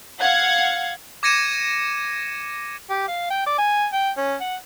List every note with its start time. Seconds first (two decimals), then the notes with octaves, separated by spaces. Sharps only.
0.20 F5 F#5 G#6
1.23 D6 G#6 A#6 C#7 D#7 E7
2.90 G4
3.08 F5
3.30 G5
3.47 D5
3.58 G#5
3.93 G5
4.18 C#4
4.41 F#5